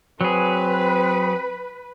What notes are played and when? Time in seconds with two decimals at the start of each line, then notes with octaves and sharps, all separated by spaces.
0.21 F#3 C4 G#4 B4